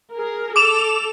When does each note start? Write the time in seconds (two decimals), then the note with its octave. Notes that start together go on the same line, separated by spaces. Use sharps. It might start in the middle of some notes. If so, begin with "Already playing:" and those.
0.13 G#4 A#4
0.56 A4 D6 E7 F7